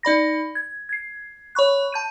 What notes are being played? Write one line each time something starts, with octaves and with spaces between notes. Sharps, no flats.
D#4 D5 B5 A#6
G#6
G#6 C7
C#5 B5 C#6 F#6
A5 G6 D#7